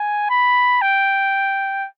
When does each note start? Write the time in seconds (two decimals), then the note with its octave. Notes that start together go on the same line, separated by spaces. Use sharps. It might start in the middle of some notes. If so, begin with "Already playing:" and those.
Already playing: G#5
0.30 B5
0.81 G5